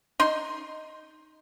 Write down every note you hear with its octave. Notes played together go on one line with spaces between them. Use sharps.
D#4 C6